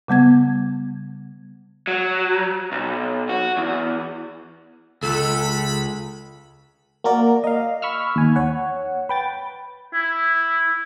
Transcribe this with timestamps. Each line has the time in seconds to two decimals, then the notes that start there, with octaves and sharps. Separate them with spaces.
0.08 C#3 G3 B3 G#6
1.87 F#3
2.72 B1
3.29 F#4
3.57 E2
5.03 C#2 A4 B5
7.04 A#3 F#4 A#4 D5
7.44 D#5 F5
7.82 B5 C#6 E6 F6
8.16 D#2 G#5
8.36 C#5 F#5
9.09 B4 G5 A6
9.93 E4